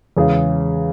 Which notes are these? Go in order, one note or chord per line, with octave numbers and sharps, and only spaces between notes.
E2 C#3 G#3 C#4 G#4